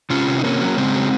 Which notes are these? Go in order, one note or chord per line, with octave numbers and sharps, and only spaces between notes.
C3 C#4 F4
C3
D#4
C3 A#3 C#4
F#3
C#3 G#3 C4
F#3